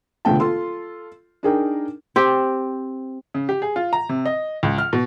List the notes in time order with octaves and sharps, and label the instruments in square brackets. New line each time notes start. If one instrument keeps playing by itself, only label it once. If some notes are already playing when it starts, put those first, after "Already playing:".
[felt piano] E1 C#2 D3 A3 G5 A5
F4 A4 C6
D4 D#4 G#4 A#4 G5
[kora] C4 G4
[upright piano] C#3
G4
G#4
F4
A#5
C3
D#5
C#2
F6
B2